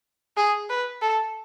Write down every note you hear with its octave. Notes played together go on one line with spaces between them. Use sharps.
G#4
B4
A4